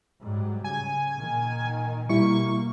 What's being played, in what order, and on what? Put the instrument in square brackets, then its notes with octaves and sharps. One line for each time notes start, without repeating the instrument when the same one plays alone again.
[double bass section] G#2 F#3 G3
[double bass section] C#3 [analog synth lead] G#5
[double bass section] A#2 D#3
[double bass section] B2 A#3 [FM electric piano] G3 E4 [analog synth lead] C#6